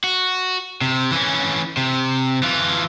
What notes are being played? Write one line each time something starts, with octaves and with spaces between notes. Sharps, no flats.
F#4
C3
E3 C#4
C3
E3 F4